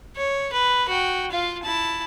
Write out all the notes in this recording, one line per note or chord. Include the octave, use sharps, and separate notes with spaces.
C#5
B4
F#4 G5
F4 F5
E4 A5